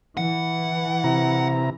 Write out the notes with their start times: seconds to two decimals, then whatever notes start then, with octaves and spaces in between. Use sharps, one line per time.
0.17 E3 F#5
1.04 C3 E4 A#5